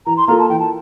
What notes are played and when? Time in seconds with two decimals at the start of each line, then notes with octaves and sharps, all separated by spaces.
0.06 E3 A#5
0.17 C6
0.27 A#3 F4 A4 A#5
0.39 A5
0.49 E3 G5
0.60 A5